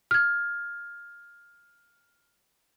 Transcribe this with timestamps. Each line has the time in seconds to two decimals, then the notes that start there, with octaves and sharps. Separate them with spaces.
0.11 F6 G#6